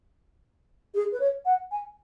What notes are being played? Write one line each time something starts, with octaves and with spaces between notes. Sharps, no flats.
G#4
B4
C#5
F#5
G#5